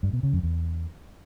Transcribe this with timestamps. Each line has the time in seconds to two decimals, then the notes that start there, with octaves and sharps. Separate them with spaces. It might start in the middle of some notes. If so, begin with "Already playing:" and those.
0.03 G2
0.13 B2
0.23 C#3
0.33 F2
0.43 E2